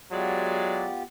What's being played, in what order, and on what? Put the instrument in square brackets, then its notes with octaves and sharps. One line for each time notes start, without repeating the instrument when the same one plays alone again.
[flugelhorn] F#3 [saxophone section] G#3 D5 [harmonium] B3 F4 G4